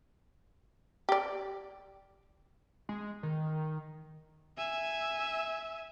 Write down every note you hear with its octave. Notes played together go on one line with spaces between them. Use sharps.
G4 D5
G#3
D#3
E5 G#5